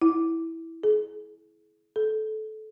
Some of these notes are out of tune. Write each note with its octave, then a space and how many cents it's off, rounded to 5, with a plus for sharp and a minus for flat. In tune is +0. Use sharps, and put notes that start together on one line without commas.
E4 -5
G#4 +35
A4 -20